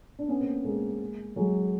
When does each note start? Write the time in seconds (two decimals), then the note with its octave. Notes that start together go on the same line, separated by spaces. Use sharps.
0.19 D4
0.28 B3 C#4
0.40 A#3 C4
0.64 G#3 A#3
1.36 F#3 G#3